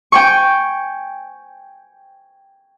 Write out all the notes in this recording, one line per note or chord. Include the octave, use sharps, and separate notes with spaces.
G5 G#5 C#6